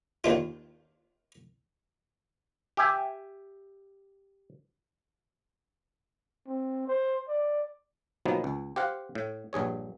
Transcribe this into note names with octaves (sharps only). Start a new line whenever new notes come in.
D#2 D4 F4
G4 E5 G#5
C4
C5
D5
B2 D#3 F3 F#3 A#3 B3
C#2
G4 C5 F5 F#5
A2
A#1 G2 G#4 C#5